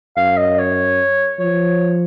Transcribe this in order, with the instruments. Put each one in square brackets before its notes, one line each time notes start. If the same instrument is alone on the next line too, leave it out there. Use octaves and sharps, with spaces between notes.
[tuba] F#2 [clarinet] F5
[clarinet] D#5
C#5
[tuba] F3 [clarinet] C#5